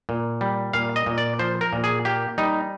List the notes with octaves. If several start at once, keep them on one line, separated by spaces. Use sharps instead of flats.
A#2
G3
A#2 F5
D#5
A#2
D5
F3 C5
A#4
A#2
G#4
A#3 G4
G3 D#4